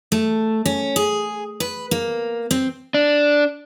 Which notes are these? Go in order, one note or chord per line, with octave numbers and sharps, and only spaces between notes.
A3
C#4
G#4
B4
A#3
C4
D4